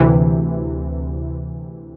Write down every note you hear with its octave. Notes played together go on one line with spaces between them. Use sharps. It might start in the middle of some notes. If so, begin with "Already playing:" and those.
Already playing: D2 C3 E3